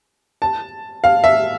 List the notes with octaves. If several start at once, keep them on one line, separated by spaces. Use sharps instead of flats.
A5
F5
E5